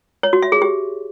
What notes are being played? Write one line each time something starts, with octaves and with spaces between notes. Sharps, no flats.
C#5
F#4
E5
G#4
G4